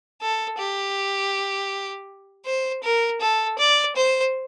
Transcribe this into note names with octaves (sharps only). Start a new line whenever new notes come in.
A4
G4
C5
A#4
A4
D5
C5